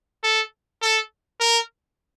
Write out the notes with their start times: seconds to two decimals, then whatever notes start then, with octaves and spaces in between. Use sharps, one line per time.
0.23 A4
0.82 A4
1.40 A#4